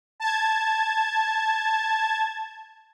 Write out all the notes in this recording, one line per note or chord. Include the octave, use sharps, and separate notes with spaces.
A5 G#6